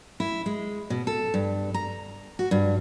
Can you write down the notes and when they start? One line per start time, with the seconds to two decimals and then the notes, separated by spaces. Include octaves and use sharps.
0.20 E4
0.46 G#3
0.90 B2
1.07 A4
1.34 G2
1.74 A#5
2.39 F#4
2.51 G2